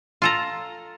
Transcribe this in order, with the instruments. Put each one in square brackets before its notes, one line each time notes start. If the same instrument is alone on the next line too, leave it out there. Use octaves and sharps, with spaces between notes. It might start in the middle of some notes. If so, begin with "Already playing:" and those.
[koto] F4 A4 A#5